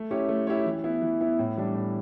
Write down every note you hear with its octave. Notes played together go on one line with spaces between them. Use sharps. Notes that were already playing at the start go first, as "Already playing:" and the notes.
Already playing: A3
C#4 E4 G4 C#5
A3
C#4 E4 G4 C#5
E3
B3 E4
E3
B3 E4
A2
E3 G3 D4
A2